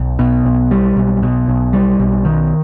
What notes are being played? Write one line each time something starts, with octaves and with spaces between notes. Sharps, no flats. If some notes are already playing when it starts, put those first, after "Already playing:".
Already playing: B1
B2
B1
G3
B1
B2
B1
G3
B1
D#3